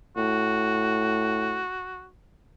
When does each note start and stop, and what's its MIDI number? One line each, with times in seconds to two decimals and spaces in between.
0.17 1.63 45
0.17 2.08 66